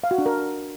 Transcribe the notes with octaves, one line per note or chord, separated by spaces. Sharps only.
F5
F#4
D4
A#4